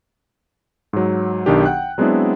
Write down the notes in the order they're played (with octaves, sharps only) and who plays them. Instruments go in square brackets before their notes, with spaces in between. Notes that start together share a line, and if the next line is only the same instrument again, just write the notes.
[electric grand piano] G#2 F#3
B1 D#3 D4 G4
F#5 G5 F#6
F#3 G#3 B3 C4 D4 E4